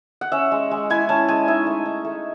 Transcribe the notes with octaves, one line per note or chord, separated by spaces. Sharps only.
F#5
C#4 E5
G#3
G#3
E4 G#5
C#4 A5
G#3 G#5
D#4 E5
A3
D#4
A3